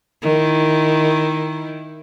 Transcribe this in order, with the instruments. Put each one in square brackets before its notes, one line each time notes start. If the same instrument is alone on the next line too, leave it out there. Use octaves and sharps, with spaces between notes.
[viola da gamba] D#3 E4